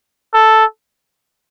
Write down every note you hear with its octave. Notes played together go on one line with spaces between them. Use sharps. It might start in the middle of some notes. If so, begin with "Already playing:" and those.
A4